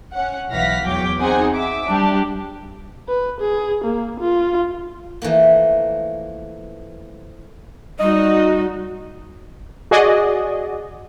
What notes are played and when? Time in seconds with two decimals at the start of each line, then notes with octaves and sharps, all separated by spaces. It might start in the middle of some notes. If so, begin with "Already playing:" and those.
0.13 C#4 F#5
0.49 B1 E3 F5 F#5 A#6 B6
0.84 E2 F#3 G5 D6
1.20 C4 D#4 G#4 C5 F#5 G#5
1.52 E5 D6
1.90 G3 D4 G4
3.08 B4
3.40 G#4
3.84 A#3
4.20 F4
5.22 E3 F3 A3 A#3
8.00 G3 D#4 F#4 D#5
9.91 F#4 G#4 D5 D#5